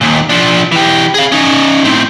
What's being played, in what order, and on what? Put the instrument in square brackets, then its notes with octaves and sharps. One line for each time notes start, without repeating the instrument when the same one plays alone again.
[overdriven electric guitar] D#2 A#2
F3 D4
E3 G4
G#4 F5
C#4 D#4
A2 C4